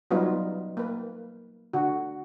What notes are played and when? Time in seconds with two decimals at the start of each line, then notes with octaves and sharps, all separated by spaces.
0.11 F#3 G3 B3 D#4 F4 B4
0.77 A#3 B4
1.73 D3 F#4